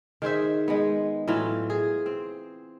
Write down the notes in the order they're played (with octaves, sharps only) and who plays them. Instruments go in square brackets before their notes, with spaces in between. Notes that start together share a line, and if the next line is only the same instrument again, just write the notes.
[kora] D#3 G#4 C5 E5
G#3 B3
A2 E3 F#3 F4
G#4
C4